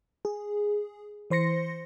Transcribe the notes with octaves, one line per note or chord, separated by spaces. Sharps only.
G#4
E3 C5 C6 A#6 C#7